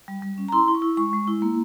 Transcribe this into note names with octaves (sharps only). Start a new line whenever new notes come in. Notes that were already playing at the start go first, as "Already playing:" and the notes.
G3
G3
C#4
A#5
E4 C6
E4
C#6
E4
G#3 C#6
G#3
E4
A#3